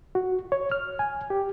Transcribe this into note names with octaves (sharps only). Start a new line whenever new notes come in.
F#4
C#5
F6
G#5
G4